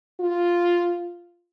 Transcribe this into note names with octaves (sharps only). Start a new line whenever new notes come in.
F4